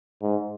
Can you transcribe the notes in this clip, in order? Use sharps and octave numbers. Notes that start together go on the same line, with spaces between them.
G#2